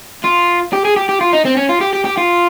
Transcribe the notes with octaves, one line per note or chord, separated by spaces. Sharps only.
F4
G4
G#4
G4
G4
F4
D#4
C4
C#4
F4
G4
G4
G4
F4